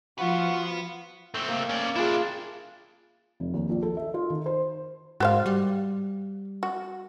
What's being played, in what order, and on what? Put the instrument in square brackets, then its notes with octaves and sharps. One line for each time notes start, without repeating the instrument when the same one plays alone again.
[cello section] F3 [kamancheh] F4 [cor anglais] F#4 [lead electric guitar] B4 F#5
[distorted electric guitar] A3 C4
[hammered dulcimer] A#3
[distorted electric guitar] C#4 D5 [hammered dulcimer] C5
[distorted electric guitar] D4 E4 [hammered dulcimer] F4 G#4
[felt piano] F1
D#2
A#1
A4
E5
F4
D#3
C5
[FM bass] G#2 [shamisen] F#4 C5 F5
[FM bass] G3
[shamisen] F#4